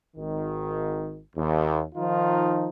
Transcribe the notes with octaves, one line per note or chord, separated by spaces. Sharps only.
G#1 D#3
D#2
D#3 F3 D#4 F4